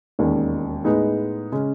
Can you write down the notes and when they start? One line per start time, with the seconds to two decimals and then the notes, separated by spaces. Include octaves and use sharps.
0.19 E1 D#2 D#3 G#3 C#4
0.84 A2 G#3 B3 D#4 G#4
1.52 C#3 G#3 C#4